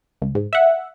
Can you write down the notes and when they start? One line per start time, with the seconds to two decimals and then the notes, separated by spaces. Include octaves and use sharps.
0.22 C#2
0.35 G#2
0.53 E5 F#5